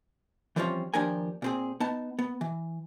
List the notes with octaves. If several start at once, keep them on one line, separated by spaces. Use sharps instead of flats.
E3 F3 G3 C4 C#4 F4
D#2 F3 D4 G4 A#4 G#5
A#2 C4 G#4
B3 D#4 A5
B3
E3